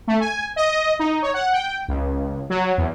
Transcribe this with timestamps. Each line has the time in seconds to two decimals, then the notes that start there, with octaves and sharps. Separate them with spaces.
0.07 A3
0.21 G#5
0.56 D#5
0.99 D#4
1.22 C#5
1.34 F#5
1.53 G5
1.88 C#2
2.50 F#3
2.78 E2